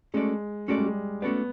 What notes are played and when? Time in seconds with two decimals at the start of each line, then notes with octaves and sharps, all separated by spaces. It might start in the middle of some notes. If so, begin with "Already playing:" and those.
0.14 G#3 A3 C#4 F#4 A4 D5
0.68 G#3 A3 C#4 F#4 A4 D5
0.78 G3
0.86 G#3
1.22 A3 B3 C#4 F#4 A4 D5